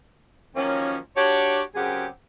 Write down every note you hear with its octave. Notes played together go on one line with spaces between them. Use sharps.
D#3 F3 F#3 A#3 C#4
D4 F#4 G4 C#5
F#2 C#3 C4 G4 G#4 F#5